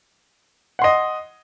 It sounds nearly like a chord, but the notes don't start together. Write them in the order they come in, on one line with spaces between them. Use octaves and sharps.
F#5 C6 D#5